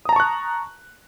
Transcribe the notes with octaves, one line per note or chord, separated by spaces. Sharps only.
A5 A#5 C#6 D#6 F#6